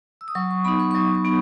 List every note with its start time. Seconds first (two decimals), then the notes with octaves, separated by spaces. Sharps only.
0.21 E6
0.28 D#6
0.35 F#3 C#6
0.51 C#6
0.65 B3 D#4 B5
0.80 C#6
0.91 C#6
0.95 F#3 D#6
1.15 C#6
1.25 B3 D#4